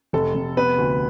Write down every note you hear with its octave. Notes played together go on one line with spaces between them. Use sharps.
F1 A4
F1
B3 B4
D2